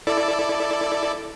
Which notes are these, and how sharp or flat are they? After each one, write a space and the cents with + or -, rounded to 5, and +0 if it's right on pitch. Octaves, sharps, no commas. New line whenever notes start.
E4 +0 A4 +0 D5 +0